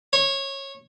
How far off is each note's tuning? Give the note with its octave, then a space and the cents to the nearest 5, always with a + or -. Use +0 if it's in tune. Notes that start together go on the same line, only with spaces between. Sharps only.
C#5 -20